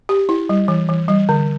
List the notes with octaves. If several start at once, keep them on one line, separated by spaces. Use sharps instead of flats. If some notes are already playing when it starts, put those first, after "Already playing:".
G4
E4
G3
E3
E3
G3
D3